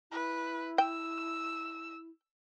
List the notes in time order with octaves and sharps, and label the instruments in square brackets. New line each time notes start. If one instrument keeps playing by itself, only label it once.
[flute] E4 [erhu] B4
[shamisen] G5 [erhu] E6